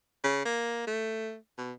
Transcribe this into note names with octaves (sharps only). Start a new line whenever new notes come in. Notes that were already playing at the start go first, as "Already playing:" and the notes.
C#3
A#3
A3
B2